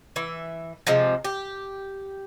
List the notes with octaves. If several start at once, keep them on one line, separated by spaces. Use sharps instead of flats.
E3 E5
C3 F3 G#3
G4